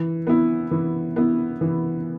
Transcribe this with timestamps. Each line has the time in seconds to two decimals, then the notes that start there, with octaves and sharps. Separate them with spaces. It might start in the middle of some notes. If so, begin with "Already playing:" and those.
Already playing: E3
0.27 B3 E4
0.71 E3
1.16 B3 E4
1.61 E3